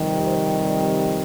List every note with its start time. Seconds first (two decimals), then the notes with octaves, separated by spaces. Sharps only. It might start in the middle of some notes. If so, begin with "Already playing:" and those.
Already playing: F2 C3 D#3 G3
0.23 C5
0.62 D5